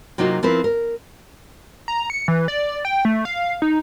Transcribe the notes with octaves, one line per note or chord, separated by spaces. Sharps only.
C3 F#3 A#3 D#4 F4 F#4
F3 C4 E4 A#4 B4
A#4
A#5
C#7
E3
D5
G5
A3
F5
D#4